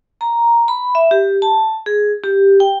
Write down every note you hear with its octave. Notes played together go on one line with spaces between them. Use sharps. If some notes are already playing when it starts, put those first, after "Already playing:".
A#5
B5
E5
G4
A5
G#4
G4
G5